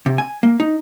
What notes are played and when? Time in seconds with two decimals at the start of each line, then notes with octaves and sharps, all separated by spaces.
0.06 C3
0.18 G#5
0.43 A#3
0.60 D#4